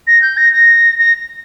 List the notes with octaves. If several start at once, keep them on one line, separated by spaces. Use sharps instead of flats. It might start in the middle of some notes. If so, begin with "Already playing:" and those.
A#6
G6
A#6
A#6
A#6